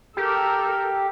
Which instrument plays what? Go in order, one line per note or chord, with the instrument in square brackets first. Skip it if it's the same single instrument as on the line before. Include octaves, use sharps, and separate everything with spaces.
[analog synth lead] G4 [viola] A4 A#4